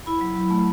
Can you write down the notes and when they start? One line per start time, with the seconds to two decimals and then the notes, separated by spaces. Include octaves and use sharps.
0.06 E4 B5
0.21 F#3
0.36 F#3
0.50 A3